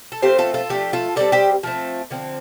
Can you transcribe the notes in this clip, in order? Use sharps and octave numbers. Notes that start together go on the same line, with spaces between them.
A4
F3 A3 C4 G4 C5
F4 A4
F4 A4
F3 A3 D4 G4
F4 A4
D3 G3 C4 A4 D5
G4 C5
F3 A3 C4
D3 F3 C4